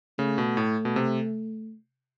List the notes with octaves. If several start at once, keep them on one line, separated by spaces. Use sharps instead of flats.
C#3 A3
B2
A2
B2
C3